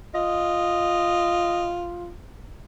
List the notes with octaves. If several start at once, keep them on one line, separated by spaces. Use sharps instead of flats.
F4 D#5